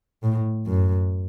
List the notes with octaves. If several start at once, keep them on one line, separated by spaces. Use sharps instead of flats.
A2
F#2